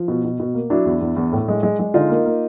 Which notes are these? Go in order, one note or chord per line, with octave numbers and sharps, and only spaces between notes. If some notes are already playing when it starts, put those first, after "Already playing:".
Already playing: F3
B2
B2
B2
A#3
F#3 D4 E4
E2
E2
E2
A2
G#3
G#3
G#3
D3 D#4 F4
A#3
A#3